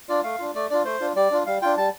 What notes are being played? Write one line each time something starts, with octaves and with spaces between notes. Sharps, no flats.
D4 F4 D5
A3 F5
D4 F4
A3 D5
D4 F4 D5
A3 C5
D4 F4
G3 D5
D4 F4
G3 F5
D4 F4 G5
G3 A5